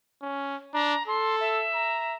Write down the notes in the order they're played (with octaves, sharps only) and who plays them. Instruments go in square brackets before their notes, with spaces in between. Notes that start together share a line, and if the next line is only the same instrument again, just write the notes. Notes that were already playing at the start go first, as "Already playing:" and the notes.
[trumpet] C#4
[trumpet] D4 [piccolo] A#5
[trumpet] A4 [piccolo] C6
[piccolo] E5
[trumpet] A#5